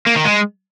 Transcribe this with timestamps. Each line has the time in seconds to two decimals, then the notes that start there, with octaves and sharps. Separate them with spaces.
0.06 A#3
0.16 D#3
0.25 G#3